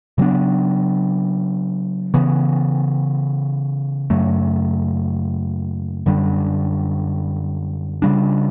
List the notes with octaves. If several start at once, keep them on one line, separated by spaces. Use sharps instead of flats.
C#3 F#3 B3 D4
C#3 E3 B3
F#2 C#3 F#3 A3
F#2 D3 G3 D4
C#3 G3 D4